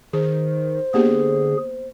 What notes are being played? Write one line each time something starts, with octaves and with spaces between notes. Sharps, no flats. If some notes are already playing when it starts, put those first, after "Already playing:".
D#3 G#4 C5
D3 A#3 B3 G4 G#4